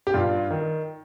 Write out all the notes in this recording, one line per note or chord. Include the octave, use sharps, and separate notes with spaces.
G4
G2 F4
D#3